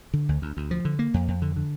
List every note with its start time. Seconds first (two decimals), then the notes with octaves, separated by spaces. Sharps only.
0.14 D3
0.29 D2
0.42 D2
0.57 D2
0.71 F3
0.85 D3
0.99 A#3
1.14 F2
1.28 F2
1.42 D3
1.56 D3